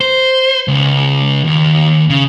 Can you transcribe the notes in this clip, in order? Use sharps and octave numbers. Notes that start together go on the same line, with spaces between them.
C5
C#2
D#2
C#3